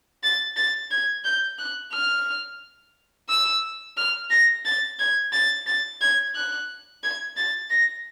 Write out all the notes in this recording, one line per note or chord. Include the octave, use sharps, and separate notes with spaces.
A6
A6
G#6
G6
F#6
F6
E6
F6
A#6
A6
G#6
A6
A6
G#6
F#6
G#6
A6
A#6